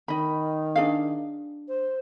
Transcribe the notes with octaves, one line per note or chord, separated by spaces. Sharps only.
D#3 D#5 B5
D4 G#4 F5
C5